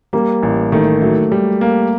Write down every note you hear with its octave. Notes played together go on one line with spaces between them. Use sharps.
G3 A#3
A1
D#3 A3
F#3 A3
G3
A#3